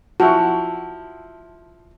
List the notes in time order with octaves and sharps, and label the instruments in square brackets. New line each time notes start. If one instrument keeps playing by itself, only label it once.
[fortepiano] F3 E4 [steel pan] F#4 [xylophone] A5